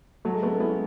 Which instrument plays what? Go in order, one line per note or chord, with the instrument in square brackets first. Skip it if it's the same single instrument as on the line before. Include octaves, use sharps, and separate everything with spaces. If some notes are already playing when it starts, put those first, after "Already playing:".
[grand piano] F#3 [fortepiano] A3
[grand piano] G#3
[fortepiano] A3 [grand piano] B3
[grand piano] C#4
[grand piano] B3 [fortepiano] E4